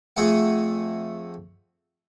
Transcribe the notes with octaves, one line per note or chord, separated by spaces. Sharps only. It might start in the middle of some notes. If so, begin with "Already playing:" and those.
F2 A3 G#4 F#5